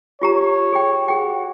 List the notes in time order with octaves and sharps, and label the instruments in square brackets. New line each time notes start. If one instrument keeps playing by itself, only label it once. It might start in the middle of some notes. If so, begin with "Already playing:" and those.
[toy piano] F4 G4 A#5 [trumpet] C#5
[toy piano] G#4 G5
[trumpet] F#4 [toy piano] G#4 G5